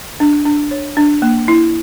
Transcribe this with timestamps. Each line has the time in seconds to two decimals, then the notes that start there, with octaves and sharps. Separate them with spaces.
0.20 D4
0.45 D4
0.71 C#5
0.97 D4
1.22 A#3
1.48 E4